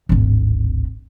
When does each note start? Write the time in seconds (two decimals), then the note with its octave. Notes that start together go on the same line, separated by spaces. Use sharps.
0.09 D1 G#1